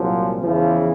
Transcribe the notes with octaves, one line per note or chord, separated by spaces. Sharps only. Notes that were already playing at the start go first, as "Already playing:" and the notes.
Already playing: C2 A#2 F3 F#3
E2 C#3 E3 F3